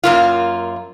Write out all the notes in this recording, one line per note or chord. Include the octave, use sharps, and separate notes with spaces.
F#2 A#3 F4